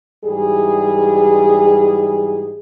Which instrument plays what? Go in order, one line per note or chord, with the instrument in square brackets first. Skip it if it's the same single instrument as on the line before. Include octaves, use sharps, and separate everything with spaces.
[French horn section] G#2 E3 G3 G#4